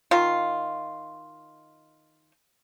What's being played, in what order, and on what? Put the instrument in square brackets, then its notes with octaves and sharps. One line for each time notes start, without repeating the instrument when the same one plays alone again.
[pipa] D#3 F4